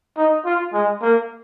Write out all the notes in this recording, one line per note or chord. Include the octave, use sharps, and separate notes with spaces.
D#4
F4
G#3
A#3